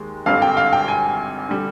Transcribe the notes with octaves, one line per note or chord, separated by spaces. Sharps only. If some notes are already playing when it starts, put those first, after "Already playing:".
Already playing: D#2 G#3
G#1 G2 D3 G3 F5
G5
F5
G5
G#5
D3 G3